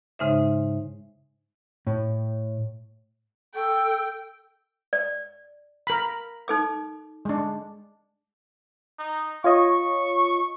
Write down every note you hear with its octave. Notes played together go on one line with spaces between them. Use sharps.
G#2 C#3 G#3 D#4 C5 E5
A2
A4 G5
D5
A#4 B5
D#4 A4 D6
G#3 D4
D#4
F4 C#5 D#5 C#6